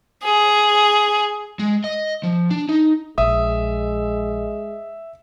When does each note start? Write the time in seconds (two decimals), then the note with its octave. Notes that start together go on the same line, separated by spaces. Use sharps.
0.24 G#4
1.59 G#3
1.84 D#5
2.23 F3
2.51 D4
2.69 D#4
3.18 A#1 G#3 E5 D#6